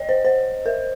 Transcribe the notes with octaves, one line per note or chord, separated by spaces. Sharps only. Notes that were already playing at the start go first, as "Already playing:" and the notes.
Already playing: C#5 D#5
C5
C5
A#4